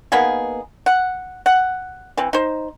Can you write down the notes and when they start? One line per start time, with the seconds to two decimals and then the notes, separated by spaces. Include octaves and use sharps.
0.12 A#3 B3 D#4 G#4
0.86 F#5
1.46 F#5
2.17 E3 C4
2.33 D#4 C5